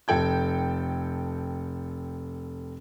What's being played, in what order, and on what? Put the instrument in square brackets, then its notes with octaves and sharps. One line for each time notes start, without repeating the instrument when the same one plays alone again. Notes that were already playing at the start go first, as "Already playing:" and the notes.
[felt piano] F1 A4 G5 G#6